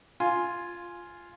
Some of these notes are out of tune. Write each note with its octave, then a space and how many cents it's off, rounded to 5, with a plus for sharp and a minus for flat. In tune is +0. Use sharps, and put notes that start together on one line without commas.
F4 +0 G#5 +5